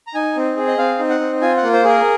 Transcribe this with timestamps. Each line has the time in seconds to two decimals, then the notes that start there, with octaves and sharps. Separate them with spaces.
0.07 A#5
0.14 D#4 G#5
0.36 C4
0.57 G#4
0.67 D#5
0.78 C4 F5
0.99 D#4
1.10 F#5
1.20 C4
1.41 F4 G#5
1.57 F#5
1.63 A#3
1.73 C5
1.84 G#4 A#4